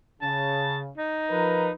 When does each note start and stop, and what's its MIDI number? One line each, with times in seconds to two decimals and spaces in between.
0.22 0.90 49
0.22 0.78 81
0.97 1.72 63
1.30 1.70 53
1.30 1.70 70
1.30 1.70 71